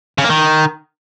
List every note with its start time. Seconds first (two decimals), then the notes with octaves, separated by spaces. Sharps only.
0.18 C#3
0.24 A#3
0.30 D#3